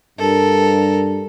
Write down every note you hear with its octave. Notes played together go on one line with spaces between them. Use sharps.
G2 A4 A#4